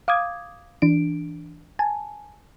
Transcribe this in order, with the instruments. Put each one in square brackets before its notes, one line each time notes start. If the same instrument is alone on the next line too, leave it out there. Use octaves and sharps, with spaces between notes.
[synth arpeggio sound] F5 D6 D#6 G#6
E3 D4 D7
G#5 A5